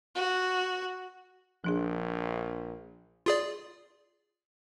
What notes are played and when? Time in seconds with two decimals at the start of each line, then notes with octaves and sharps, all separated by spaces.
0.15 F#4
1.64 A#1 F3 D4 G#4
3.26 F4 G#4 D5